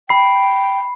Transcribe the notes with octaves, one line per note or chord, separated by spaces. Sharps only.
G5 B5 C7